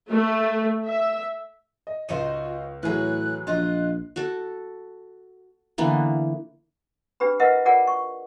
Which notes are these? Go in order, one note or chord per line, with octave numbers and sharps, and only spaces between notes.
A3
E5
D#5
C#2 D#4 F4 F#4 C5 D#7
A2 E3 F#3 G#4 B4 F#6
A#1 F4 D#5 F#6
F#4 A4
D3 E3 A#3 B3
D4 G4 B4 B5
E4 A#4 B4 D#5 E5 F#5
F4 G#4 A#4 D5 F#5
C#6